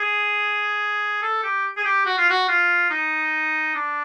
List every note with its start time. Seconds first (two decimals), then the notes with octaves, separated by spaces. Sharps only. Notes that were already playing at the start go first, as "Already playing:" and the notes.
Already playing: G#4
1.22 A4
1.44 G4
1.77 G#4
1.85 G4
2.06 F#4
2.18 F4
2.30 F#4
2.48 F4
2.90 D#4
3.75 D4